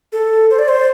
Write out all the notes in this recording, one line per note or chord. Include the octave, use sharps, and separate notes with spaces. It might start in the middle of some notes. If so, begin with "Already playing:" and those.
A4
C5
D5
C5